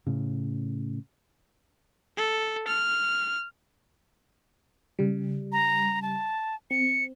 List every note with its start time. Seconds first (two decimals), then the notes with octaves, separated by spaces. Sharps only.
0.07 A2 C#3
2.17 A4
2.68 F6
4.99 C#3 G3
5.52 A#5
6.02 A5
6.71 C4 C#7